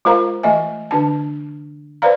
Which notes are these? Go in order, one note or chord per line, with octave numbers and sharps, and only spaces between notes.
G#3 F4 A#4 C5 F5 A#5
E3 A3 D#5 E5 G#5
D3 D4 A5
B4 C5 D5 F5 A#5